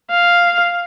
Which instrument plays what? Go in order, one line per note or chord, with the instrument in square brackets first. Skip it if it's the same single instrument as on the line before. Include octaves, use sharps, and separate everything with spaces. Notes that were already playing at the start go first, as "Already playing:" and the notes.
[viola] F5